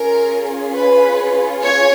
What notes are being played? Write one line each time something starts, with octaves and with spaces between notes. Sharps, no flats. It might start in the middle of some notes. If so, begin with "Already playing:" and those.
Already playing: C#4 F4 G#4 A#4
B4
C#5